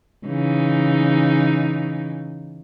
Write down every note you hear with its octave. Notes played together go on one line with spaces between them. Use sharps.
C#3 E3 D#4